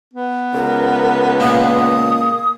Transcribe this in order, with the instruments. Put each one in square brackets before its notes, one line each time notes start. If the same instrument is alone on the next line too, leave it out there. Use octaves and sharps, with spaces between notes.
[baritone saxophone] B3
[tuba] C#2 [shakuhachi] A#4
[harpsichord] A#2 [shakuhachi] D#6